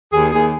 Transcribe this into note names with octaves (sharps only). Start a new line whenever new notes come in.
D#2 G#4
D#2 G#4